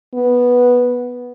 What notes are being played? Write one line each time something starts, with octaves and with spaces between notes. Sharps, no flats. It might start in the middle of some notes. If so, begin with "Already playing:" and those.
B3